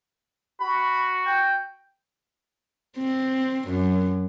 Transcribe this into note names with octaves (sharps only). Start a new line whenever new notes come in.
F#4 B5
G5
C4
F#2